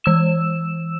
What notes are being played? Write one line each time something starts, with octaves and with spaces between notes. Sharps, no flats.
E3 E6 E7